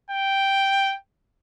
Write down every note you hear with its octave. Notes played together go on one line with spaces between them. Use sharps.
G5